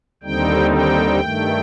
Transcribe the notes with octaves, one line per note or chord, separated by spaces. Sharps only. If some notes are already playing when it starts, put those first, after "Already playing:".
D#2 D3 G3 C4 D#4 G5
G5
G2 D#3 A3